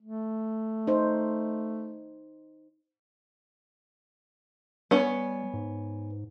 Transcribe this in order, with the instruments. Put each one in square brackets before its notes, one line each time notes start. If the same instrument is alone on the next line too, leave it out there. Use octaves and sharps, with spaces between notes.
[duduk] A3
[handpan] D#4 C5
[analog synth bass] G3 [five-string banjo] B3 C#4
[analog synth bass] G#2